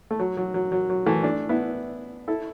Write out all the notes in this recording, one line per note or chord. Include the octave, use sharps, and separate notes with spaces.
A3
F#3
F#3
F#3
F#3
F#3
E3 A3
A3 D4
B3 E4
E4 A4